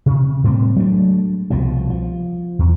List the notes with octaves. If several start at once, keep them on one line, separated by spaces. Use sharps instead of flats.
C3
A2 G3 C4
F#3 G#3 A3 D4
C2 B2 F3 G3
F3
E2